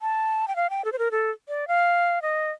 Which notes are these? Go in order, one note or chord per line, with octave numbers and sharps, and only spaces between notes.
A5
G5
F5
G5
A4
C5
A#4
A4
D5
F5
D#5